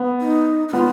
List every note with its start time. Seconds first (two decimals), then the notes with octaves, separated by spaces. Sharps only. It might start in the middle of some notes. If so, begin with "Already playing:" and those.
Already playing: B3
0.21 D#4
0.68 D#4
0.73 B3 F4